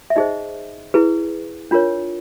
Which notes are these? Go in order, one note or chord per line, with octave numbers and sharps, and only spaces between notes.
E5
D#4 G#4 C5 D#5
E4 G#4 B4
D4 F4 A#4 C#5